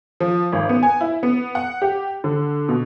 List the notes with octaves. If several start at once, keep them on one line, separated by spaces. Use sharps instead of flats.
F3
G#1
B3
G#5
E4
B3
F#5
G4
D3
B2